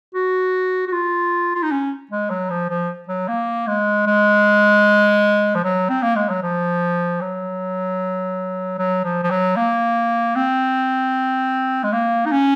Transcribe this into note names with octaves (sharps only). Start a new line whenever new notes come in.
F#4
F#4
F4
F4
D#4
C#4
G#3
F#3
F3
F3
F#3
A#3
G#3
G#3
F3
F#3
C4
A#3
G#3
F#3
F3
F#3
F#3
F3
F3
F#3
A#3
C4
G#3
A#3
D#4
C#4